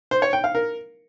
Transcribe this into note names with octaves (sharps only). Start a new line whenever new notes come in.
C5
C#5
G5
F5
A#4